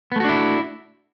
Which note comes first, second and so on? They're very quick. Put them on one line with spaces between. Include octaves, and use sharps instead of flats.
B3 A3 F#4 D4 E4